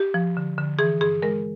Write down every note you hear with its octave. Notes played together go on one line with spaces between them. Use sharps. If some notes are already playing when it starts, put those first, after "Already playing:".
Already playing: G4
F3
D3
D3
E3 G#4
G2 G#4
G#3 A#4